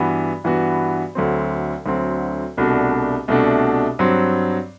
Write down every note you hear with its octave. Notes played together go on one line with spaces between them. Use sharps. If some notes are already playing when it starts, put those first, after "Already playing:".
Already playing: G2 E3 B3 F#4
G2 E3 B3 F#4
D2 D3 F#3 C4
D2 D3 F#3 C4
C2 B2 A3 D4 F#4
C2 B2 A3 D4 F#4
G2 F#3 C4